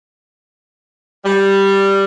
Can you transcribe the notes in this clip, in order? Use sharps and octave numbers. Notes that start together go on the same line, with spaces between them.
G3